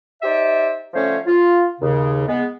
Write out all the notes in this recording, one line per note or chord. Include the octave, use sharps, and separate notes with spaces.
D#4 G4 C5 D5 E5
D3 F3 A3 C#4 C5 C#5
F4
D#2 C#3
G#3 B3